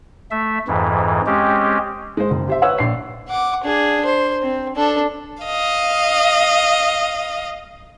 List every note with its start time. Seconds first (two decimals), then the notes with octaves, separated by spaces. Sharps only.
0.31 A3 E5
0.68 F2 G#2 E3
1.26 G#3 C4 C#4 G4
2.17 G#3 C5
2.30 F#1
2.47 G4 C5 E5
2.62 B4 C#5 F#5 C#6 E6
2.78 A#1 C7
3.28 F#5 D6
3.64 D4 G#4
4.05 C5
4.42 C4
4.76 D4 A4
5.44 D#5 F5